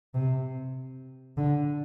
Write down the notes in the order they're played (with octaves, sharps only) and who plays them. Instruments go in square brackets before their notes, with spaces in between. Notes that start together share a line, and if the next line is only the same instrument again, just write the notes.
[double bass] C3
D3